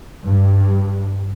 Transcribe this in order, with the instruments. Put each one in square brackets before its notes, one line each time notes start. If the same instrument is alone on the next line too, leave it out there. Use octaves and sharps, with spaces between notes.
[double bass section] G2